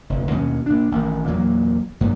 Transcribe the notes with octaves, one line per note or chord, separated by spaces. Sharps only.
F1 D2
D#2 B2 C#4
A#2 D4
A1 D#3
E2 A#2 F#3 A#3
G2 A#2 F#3 G3